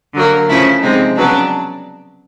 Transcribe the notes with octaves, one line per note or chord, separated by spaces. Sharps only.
D3 F#3 A#3
C#3 F3 A3 E4
C3 F3 G#3 C4 D#4
C#3 F#3 B3 D4